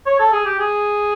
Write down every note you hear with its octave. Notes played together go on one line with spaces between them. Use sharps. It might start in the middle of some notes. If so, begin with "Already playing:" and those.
C#5
A4
G#4
G4
G#4